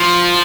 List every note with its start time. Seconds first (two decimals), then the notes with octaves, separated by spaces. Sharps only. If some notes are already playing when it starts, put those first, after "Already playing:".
Already playing: F3 F4